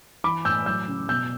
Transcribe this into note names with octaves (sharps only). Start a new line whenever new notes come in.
E3 B5 D6
A2 E6 G6
F#3 E6 G6
C#3
B2 E6 G6